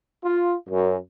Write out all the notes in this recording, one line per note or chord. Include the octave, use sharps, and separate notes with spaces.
F4
F#2